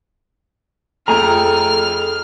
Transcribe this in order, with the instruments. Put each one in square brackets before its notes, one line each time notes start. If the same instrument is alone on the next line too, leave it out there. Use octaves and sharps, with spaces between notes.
[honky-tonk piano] F2 A3 F7 [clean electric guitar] G#4 [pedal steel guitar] G5 G#5 A#5 [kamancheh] F6